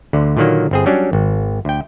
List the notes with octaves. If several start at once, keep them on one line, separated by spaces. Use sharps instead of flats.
D2 D3
A#2 D3 D#3 F#3 A#3
G1 C4 G#4
F#3 G3 C#4 D4
G#1
D2 G5